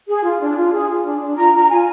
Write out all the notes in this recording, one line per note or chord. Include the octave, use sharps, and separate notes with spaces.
G#4
F4
D4
F4
G#4
F4
D4
D4
F4 A#5
F4 A#5
F4 G#5